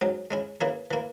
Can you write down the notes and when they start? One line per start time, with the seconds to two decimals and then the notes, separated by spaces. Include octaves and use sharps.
0.01 G#2 F#3 C#4
0.31 G#3 C#4 E4
0.61 E3 A#3 C#4 E4 G#4
0.91 E3 A#3 E4